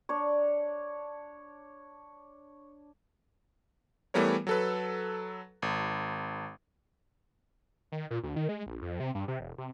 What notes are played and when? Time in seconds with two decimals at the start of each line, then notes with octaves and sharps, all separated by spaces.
0.09 D4 C#5
4.14 E3 G3 A3 B3 A#4 C#5
4.47 F#3 A4 B4
5.62 G#1
7.92 D#3
8.11 A#2
8.23 D2
8.36 D#3
8.49 G#3
8.66 A#1
8.82 F2
9.00 C3
9.15 G2
9.28 C3
9.40 E1
9.58 C3